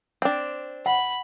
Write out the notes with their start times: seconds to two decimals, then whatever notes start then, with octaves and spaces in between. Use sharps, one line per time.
0.22 C4 D4
0.86 F#5 B5